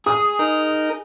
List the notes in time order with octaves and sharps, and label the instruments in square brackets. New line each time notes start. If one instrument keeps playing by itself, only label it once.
[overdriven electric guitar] G#4 [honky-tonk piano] D#6
[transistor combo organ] D#4 A#4